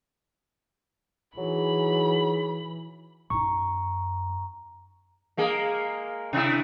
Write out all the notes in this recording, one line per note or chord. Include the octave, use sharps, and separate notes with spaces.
E3 F#3 D#4 G#4 B5
F#2 D#4 A#5 C#6
G#3 A#3 G#4
C3 E4